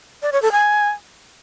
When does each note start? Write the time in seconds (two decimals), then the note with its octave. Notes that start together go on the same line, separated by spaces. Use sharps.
0.22 D5
0.32 C#5
0.42 A4
0.52 G#5